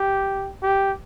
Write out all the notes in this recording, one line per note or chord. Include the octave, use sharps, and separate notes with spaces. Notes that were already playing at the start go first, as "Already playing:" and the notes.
Already playing: G4
G4